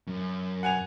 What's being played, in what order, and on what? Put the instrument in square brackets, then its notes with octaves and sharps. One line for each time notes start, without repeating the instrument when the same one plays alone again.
[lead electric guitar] F#2
[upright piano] F#5 G#5 F7